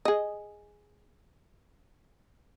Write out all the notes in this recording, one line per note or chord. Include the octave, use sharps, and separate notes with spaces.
G#4 D#5